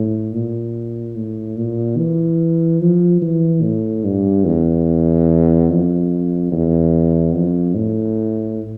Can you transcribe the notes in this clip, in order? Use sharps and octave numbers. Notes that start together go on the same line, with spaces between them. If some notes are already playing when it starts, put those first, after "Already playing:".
Already playing: A2
A#2
A2
A#2
E3
F3
E3
A2
G2
E2
F2
E2
F2
A2